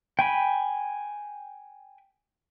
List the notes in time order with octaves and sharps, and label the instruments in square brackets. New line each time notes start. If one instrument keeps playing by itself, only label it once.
[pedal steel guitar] G5 G#5 B5